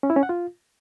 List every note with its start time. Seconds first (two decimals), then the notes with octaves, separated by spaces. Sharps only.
0.03 C#4
0.10 E4
0.16 C#4
0.23 F#5
0.29 F4